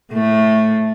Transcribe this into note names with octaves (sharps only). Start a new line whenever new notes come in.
A2 A3